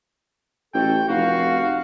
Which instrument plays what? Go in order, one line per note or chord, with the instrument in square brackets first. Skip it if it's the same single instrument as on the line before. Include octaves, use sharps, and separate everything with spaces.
[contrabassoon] A1 [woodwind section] F#4 A4 [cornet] G5
[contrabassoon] F1 [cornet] F#4 [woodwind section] F5